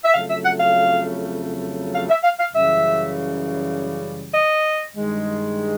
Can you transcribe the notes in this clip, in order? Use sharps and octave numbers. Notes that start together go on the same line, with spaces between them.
E5
F2 C#3 F#3 A3 F5
E5
F#5
F5
F5
E5
F5
F5
F#2 C#3 E3 G3 E5
D#5
G2 D#3 G#3